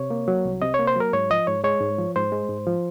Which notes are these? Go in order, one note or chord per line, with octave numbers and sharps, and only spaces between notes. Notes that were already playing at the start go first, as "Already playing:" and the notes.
Already playing: C3 C#5
A#3
F#3
C2
C3 D#5
C#5
A#3
C5
F#3 A#4
G#2 C#5
F3 D#5
G#2 C#5
G#3 C#5
G#2
F3
G#2 C5
G#3
G#2
F3